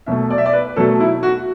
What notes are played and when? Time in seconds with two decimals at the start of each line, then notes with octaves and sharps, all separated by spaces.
0.06 B2 F#3 A3 E5
0.30 D5
0.38 E5
0.46 D5
0.53 B4
0.76 B2 F#3 A3 A4
1.00 E4
1.23 F#4